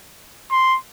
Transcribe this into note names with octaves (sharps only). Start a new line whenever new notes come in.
C6